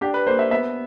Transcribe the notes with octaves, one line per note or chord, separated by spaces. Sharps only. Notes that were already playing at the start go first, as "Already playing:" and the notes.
D4 G4
B4
A#3 C5
E5
B3 E5